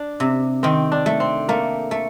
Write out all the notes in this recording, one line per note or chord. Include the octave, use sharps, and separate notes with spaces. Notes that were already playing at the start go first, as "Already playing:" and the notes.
Already playing: D4
C3
D#3 C4
D4
A3
C4
A3 A#3
A3